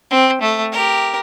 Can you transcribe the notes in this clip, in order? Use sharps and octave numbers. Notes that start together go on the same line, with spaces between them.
C4
A3
G4 A#4